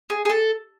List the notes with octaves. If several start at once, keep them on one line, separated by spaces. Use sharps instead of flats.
G#4
G#4
A4